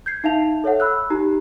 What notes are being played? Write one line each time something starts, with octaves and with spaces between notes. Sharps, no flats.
G6 G#6 C7
D#4 E5 F5 A5 F7
A4 C#5 E5 F#5
B5 E6 F#6
D#4 G4 A#5